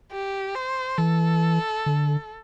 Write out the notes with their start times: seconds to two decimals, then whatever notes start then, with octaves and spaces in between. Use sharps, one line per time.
0.11 G4
0.55 C5
0.98 E3 A4
1.86 D3